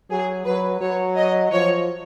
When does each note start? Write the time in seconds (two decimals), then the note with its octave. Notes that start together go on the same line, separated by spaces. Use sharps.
0.10 F#3 G#4
0.46 F#3 B4
0.81 F#3 C#5
1.17 D#5
1.52 F3 C#5